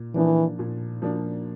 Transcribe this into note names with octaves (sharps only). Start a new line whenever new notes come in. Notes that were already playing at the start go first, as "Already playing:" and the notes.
Already playing: A#2
E3 F3 A#3 D4
A#2
F3 A#3 D4